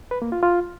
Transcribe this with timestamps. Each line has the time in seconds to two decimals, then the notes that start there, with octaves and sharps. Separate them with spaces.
0.11 B4
0.22 A#3
0.32 F4
0.43 F4